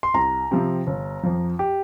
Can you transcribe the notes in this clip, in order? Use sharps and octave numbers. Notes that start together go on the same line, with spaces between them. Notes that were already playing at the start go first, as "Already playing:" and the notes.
C6
C2 A#5
C3 F3 C4 G4
G1
F2 F3
G4